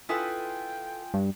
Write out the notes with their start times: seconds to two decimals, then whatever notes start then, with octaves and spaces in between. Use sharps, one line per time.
0.09 E4 F4 A4 B4 G5 G#5 D#6
1.14 G2